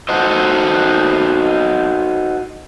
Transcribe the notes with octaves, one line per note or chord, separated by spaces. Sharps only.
D#4 F#4 A4 C5 D#5